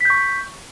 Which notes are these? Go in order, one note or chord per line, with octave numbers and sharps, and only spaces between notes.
C#6 G6 B6